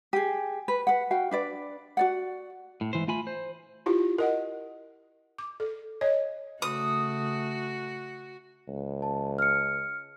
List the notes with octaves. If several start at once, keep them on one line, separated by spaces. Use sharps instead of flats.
G4 G#4
B4
B4 F#5
F#4 F5 G5
D4 B4 D5
F#4 D5 F#5
A2
G#2 E3 C5
A3 F4 G#5 B5
C5
E4 F4 G4
A#4 D#5 F#5
D6
A4
C#5 D#5
C#3 A3 F#4 D#6
C#2
A5
F6 C#7